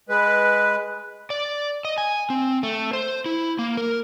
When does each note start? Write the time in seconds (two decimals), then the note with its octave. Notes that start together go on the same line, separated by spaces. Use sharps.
0.09 G#3 B4
1.30 D5
1.85 D#5
1.98 G#5
2.30 C4
2.63 A3
2.93 C5
3.26 E4
3.59 A#3
3.77 A#4